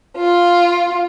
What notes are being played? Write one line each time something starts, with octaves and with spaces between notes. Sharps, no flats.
F4